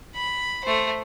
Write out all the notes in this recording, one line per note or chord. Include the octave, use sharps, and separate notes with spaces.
B5
A3 C5